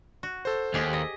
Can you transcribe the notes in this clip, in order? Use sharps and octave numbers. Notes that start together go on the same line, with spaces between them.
F#4
A4 C5
D#2 G4 G#4
D#5